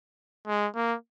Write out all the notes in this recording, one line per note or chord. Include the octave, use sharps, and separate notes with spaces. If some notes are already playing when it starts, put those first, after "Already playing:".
G#3
A#3